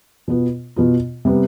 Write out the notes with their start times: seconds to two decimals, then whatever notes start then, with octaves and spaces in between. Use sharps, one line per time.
0.28 B2 B3 F4
0.76 B2 B3 F4
1.25 C3 G3 B3